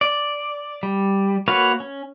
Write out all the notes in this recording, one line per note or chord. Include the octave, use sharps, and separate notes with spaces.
D5
G3
A#3 F#4 B4 C#5 F5
C#4